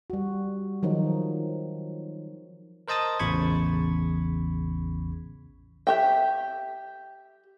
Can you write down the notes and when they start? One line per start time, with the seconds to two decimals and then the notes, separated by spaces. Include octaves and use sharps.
0.10 G3 F#4
0.83 D#3 F3 F#3 D#4
2.88 A#4 C5 D#5 A5 D#6 A6
3.19 A1 E2 C#3 B5 C#6 G#6
5.87 G4 E5 G5